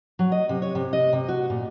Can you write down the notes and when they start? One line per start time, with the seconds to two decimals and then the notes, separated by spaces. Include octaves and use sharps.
0.19 F#3
0.32 D#5
0.49 C3
0.62 C#5
0.75 C3
0.93 D#5
1.13 C3
1.28 F#4
1.50 A#2